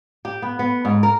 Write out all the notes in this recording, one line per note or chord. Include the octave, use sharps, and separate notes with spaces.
G4
B3
B3
G#2
A#4